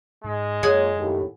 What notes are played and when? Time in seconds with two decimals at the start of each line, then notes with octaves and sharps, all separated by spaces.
0.24 G#2 G#3
0.63 F#2 A#3 F4 G#4 C#5 F#5 G#5
0.97 D#2 A2